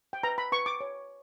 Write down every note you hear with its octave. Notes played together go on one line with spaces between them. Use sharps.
G5
B4 A#5
B5
B4 C#6
D6
C#5